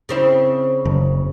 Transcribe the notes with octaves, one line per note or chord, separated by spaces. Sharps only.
C#3 C4 E4
F#1